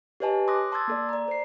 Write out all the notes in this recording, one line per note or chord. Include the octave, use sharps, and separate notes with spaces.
G4 B4 C#5 D#5 G#5 A5
C6 D6 D#6 F#6 A#6
A5 C6 D6 E6 G#6 A6
A#3 A4 D5
D5 A#5
C5 C7